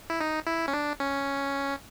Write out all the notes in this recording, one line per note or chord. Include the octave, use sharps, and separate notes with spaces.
E4
D#4
E4
C#4
D4
C#4